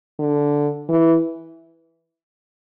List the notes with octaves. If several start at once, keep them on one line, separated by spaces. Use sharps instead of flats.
D3
E3